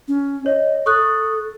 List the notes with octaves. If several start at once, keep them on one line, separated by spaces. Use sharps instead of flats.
C#4
C#5 D#5
A4 C#6 D#6 F#6